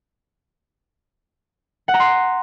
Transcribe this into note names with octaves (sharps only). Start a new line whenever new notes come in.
F#5
A#5
C6